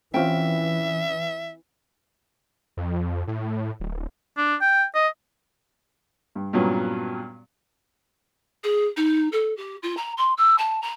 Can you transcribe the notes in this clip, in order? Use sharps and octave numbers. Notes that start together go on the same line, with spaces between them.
E3 C4 C#4 F4 E5 G5
F2
A2
D1
D4
G5
D#5
G2
G2 A#2 F#3 B3 C#4
G#4
D#4
A4
G4
F4
A#5
C6
E6
A5
A#5